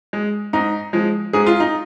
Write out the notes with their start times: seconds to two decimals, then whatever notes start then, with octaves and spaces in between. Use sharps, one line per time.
0.13 G#3
0.53 G#2 D#4
0.93 F3 G#3
1.33 G#2 G#4
1.47 F4
1.60 D#4